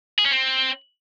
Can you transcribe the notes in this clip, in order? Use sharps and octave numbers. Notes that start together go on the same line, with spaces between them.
G#4
C#4
C4